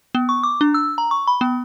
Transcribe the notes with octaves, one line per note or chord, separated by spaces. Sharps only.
B3
C#6
D6
D4
E6
A#5
C#6
B5
B3